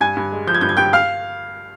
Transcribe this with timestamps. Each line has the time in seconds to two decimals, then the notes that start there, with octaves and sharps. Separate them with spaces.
0.01 G2 G#5 G#6
0.17 G2
0.32 G#3
0.47 F3 G6
0.55 G#6
0.61 G2 G6
0.69 G#6
0.77 G2 G5 G6
0.93 F5 F6